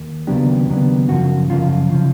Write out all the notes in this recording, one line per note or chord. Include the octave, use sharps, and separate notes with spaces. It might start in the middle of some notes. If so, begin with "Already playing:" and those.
Already playing: D#2
D#2 C#3 F#3 B3 D4 G4
D#2 C#3 F#3 B3 D4
F#2 C#3 F3 F#4
F#2 C#3 F3 F4
C#3 F3